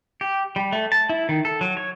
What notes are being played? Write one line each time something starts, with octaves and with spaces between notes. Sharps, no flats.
G4
G3
A3
A5
E4
D#3
A4
F#3
C#5